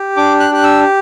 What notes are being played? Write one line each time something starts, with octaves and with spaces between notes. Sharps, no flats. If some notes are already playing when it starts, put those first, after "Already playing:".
Already playing: G4
D4 D6
F#6
G4 F#6
E6